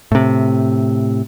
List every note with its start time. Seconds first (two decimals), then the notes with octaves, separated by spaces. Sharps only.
0.12 A2 C3